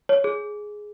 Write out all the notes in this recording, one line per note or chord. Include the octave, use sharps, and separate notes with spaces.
C#5
G#4